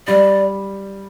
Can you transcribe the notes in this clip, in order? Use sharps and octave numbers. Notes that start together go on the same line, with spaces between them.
G3 D5